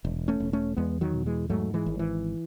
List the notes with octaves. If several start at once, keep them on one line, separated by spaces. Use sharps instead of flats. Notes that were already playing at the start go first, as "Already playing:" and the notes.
E1
A3 C#4
E1
A3 C#4
E2 G#3 B3
D#3 F#3
B2
E3 G#3
G#2 F#3 A3
E3 G#3
G#1
E3